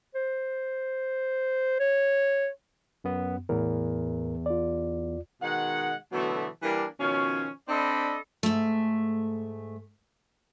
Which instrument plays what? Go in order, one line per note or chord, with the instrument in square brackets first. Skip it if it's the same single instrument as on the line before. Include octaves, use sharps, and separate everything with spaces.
[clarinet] C5
C#5
[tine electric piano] F#2 B3
[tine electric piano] E2 [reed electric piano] A2 A#4
[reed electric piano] F4 D5
[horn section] B2 D#3 G#3 F#5
B2 D3 E3 F#3 A3 B3
E3 G3 A#3 D4
B2 D#3 F3 C#4
C4 D4 A4 D5 D#5 B5
[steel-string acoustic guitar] G#2 A3